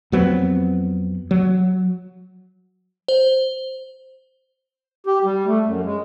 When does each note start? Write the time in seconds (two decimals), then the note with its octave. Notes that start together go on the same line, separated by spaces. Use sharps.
0.12 F2 F#3 B3 C4
1.31 F#3
3.08 C5
5.06 G4
5.25 G3
5.46 A3
5.66 F#2
5.85 G#3